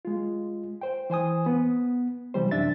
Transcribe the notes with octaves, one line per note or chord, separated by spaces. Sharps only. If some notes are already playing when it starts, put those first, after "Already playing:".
G#3 F4
C5 G5
E3 C5 G#5 D#6
B3
C3 E3 G3 C5
F#2 C3 D4 E5 A6